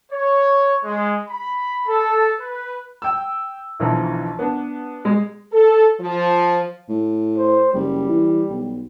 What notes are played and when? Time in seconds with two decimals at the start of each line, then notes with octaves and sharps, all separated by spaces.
0.12 C#5
0.83 G#3
1.29 B5
1.87 A4
2.39 B4
3.02 G5 E6
3.80 B1 D3 E3 F3 A#5
4.39 B3 D4
5.05 G#3 G#4
5.52 A4
6.00 F3
6.89 A2
7.38 C5
7.73 F#1 G3
8.09 E3
8.50 B1